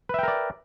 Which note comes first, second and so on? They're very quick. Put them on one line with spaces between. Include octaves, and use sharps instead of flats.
B4 E5 G5 A#4 D5